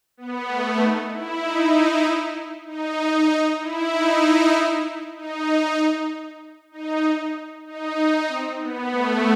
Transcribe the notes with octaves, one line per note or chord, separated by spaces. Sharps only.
B3
A3
D#4
E4
D#4
D#4
D#4
E4
D#4
D#4
D#4
D#4
C4
B3
A3